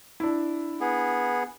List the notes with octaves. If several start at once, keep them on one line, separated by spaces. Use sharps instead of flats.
D4 E4
B3 G#4